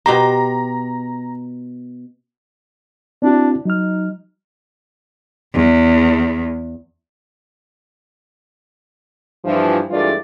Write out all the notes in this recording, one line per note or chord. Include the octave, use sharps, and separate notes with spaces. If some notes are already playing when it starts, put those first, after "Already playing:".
B2 G4 C5 A#5
C4 D4 E4 F#4
F#3 D#4 F6
E2
G2 E3 F3
G2 E3 G#3 A3 F4 D5